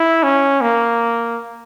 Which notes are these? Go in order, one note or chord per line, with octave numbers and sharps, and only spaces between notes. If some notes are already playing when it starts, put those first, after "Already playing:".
Already playing: E4
C#4
A#3